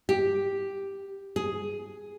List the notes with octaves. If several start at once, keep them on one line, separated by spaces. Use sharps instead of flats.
G4
G#4